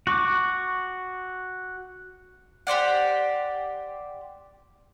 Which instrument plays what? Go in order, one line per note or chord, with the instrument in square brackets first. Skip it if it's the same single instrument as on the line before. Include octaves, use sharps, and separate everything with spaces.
[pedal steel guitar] F#4 C#6 D6
[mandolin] G4 C5 D5 F#5